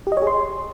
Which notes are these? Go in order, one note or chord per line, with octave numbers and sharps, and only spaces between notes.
G4
D#5
C#5
G#4
C6